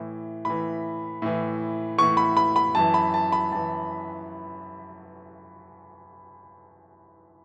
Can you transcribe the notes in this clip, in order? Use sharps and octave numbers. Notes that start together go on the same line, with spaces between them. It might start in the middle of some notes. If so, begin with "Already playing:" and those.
Already playing: A2 E3
A2 E3 B5
A2 E3
A2 E3 C#6
B5
B5
B5
F#2 E3 A5
B5
A5
B5
F#2 E3 A5